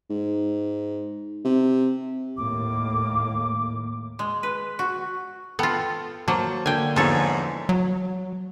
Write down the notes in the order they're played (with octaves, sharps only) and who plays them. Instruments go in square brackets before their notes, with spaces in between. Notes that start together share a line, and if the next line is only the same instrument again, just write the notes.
[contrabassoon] G#2
C3
[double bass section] D#2 A2 A#3 [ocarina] D6
[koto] G#3
B4
F#4
[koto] B3 F4 [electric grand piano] A4 G5 A5
[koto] F#3 A#3 [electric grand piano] C5 A5
[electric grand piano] D3 A#3 [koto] G5 G#5
[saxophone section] E2 G#2 [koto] F3 A4 C#5
[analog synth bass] F#3